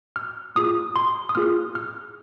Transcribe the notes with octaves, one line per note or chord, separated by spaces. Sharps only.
F6
A#3 F4 G#4 D#6
C6
D#6
A#3 F4 G#4 F6
F6